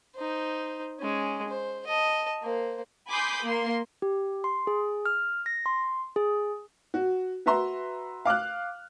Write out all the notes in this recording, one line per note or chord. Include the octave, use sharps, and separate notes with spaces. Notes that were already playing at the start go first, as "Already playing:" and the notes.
D#4 C5
G#3 C#4
C5
D#5 A5
A#3 C5
G#5 B5 C6 D6 D#6 G6
A#3 C6
G4
C6
G#4
F6
A#6
C6
G#4
F#4
F#4 B4 E5 A#5 C6
F5 D6 F6 F#6